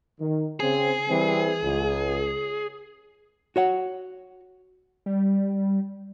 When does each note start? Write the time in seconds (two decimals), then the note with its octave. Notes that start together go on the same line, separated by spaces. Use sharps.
0.19 D#3
0.60 C#3 C4 G#4
1.08 E3 G3 C4
1.63 C#2
3.56 F#4 C#5 F#5
5.06 G3